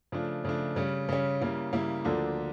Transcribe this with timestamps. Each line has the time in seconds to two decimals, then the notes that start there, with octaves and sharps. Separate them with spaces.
0.12 C#3 F3 A3 D4
0.45 C#3 F3 A3 D4
0.76 C#3 G3 C#4
1.09 C#3 G3 C#4
1.40 C#3 G3 A#3 E4
1.73 C#3 G3 A#3 E4
2.05 D2 D3 F3 A#3 D4